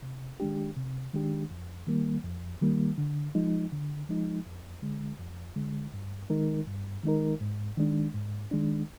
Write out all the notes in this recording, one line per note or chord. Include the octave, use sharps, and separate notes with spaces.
C3
D#3 G#3 D4 G4
C3
D#3 G#3 D4 G4
F2
D#3 G3 A#3
F2
D#3 G3 A#3
D3
F3 G#3 D#4
D3
F3 G#3 D#4
F2
D3 G#3
F2
D3 G#3
G2
D#3 G#3 D#4 A#4
G2
D#3 G#3 D#4 A#4
G#2
D#3 G#3 D4
G#2
D#3 G#3 D4